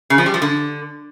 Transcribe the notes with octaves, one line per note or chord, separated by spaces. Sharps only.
C#3
F3
G3
F3
D3